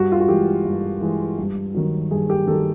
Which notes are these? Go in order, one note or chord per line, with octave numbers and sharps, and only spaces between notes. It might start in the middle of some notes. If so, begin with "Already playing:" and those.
Already playing: G2 F#4
F4
F#4
E3 G#3 G4
G2
E3 G#3
G2
D#3 F#3
G2 G#4
G4
D#3 F#3 A4